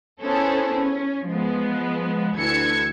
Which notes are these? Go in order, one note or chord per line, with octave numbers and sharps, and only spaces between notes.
B3 C#4 E4 G#4 A4 C5
C#4
F3 G#3 B3
D2 D3 E3 E6 G#6 C#7